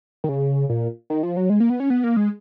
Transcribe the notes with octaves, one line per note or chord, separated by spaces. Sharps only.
D#3
C#3
A#2
D#3
F3
F#3
G#3
A#3
B3
C#4
B3
A#3
G#3